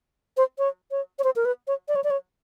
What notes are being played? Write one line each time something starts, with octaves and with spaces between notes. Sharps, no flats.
C5
C#5
C#5
C#5
C5
A#4
B4
C#5
D5
C#5
D5
C#5